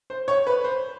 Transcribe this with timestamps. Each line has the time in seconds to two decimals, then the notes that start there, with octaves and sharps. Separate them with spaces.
0.10 C5
0.28 C#5
0.47 B4
0.64 C5